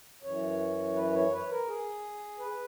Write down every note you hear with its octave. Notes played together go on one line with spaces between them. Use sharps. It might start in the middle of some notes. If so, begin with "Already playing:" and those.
F#2 E3 C#5
B4
C#5
B4
A#4
G#4
B4